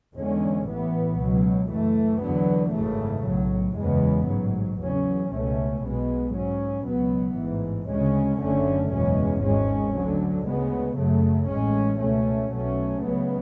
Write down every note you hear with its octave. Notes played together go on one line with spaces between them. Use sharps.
E2 D3 G#3 C#4
A1 A2 E3 B3
C#2 B2 F#3
F#2 E3 A3
E2 D3 F#3 B3
G#1 F#2 C#3 E3 A3
B1 A2 F#3
F#1 E2 C#3 G#3 B3
A1 G#2 F#3
E2 C#3 F#3 C#4
C#2 B2 A3 C#4
B1 B2 G#3 B3
G#2 F#3 C#4
C#2 B2 F#3 B3
A1 G#2 E3
D2 C#3 G#3 C#4
F#1 F#2 D3 A3 C#4
F#1 E2 B2 G#3 C#4
G#1 G#2 G#3 C#4
D2 D3 F#3
D2 C#3 G#3 B3
F#2 C#3 F#3 A3
A1 A2 G#3 C#4
C#2 B2 A3 C#4
B1 B2 F#3 A3 C#4
C#2 C#3 F#3 B3